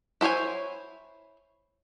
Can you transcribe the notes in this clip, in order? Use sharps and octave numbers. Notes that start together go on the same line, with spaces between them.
E4 A4 C5 C#5 G#5